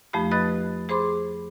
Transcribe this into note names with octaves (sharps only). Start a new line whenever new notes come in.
F2 F3 A3 D#4 G4 B5
B4 D#5 B5 D#6 F#6 A6
G#4 C5 B5 C6 D6